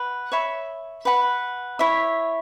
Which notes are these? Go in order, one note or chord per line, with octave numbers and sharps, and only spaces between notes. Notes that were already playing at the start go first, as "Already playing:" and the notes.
Already playing: B4 F#5
C#5 E5 B5
B4 F#5 B5
E4 C#5 E5